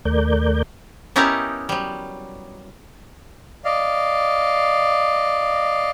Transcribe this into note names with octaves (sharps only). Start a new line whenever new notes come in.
D#2 A3 A#4 D5 G6
B3 C#4 D#4 E4 G4 A#4
F#3 G3
D5 D#5 F5